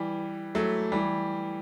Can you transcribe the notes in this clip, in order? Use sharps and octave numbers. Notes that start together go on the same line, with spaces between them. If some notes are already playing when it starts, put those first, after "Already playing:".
Already playing: E3 G3
F#3 A3
E3 G3